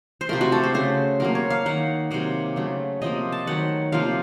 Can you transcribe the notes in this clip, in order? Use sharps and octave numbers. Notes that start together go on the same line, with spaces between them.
C5
C3 F3 A3 A#4
F#4
A4
C5
C#3 A3 C5
C3 F#3 A#3 A#4
C#5
F5
D#3 A#3 F#5
C3 F#3 A#3 F#5
C#3 F#3 A3
C3 F3 A#3 D#5
A5
D#3 F#3 A3 F#5
C3 F3 A#3 F5